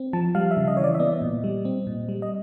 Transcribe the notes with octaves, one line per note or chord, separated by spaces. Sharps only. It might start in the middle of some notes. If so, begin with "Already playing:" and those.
Already playing: C4
F3 A5
G3 F5
E5
C#3
D#5
E3 C#5
D5
E5
B3 D#5
A#2
G3
C4
A#2
G3
D#5